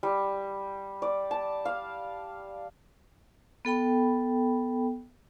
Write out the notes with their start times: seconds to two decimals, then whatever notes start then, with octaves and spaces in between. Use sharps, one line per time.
0.03 G3
1.02 D5
1.31 A5
1.65 F5
3.65 B3 A4 G5 B5